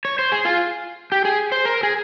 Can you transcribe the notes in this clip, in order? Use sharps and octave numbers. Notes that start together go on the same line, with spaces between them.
C#5
C5
G#4
F4
G4
G#4
C5
A#4
G#4